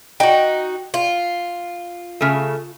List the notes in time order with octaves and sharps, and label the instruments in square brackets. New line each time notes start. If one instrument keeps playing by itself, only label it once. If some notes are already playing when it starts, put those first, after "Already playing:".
[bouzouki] D#4 F#4 [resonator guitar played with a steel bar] G5
[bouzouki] F4
[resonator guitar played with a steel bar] C#3 A3